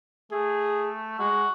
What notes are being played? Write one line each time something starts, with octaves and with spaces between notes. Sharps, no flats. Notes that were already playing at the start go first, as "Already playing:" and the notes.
A3 G#4
G#3 F#4